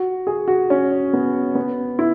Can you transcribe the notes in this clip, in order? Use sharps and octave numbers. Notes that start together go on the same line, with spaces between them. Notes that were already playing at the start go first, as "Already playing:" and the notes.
Already playing: F#4
G#4
F#4
C#4
B3
B3
E4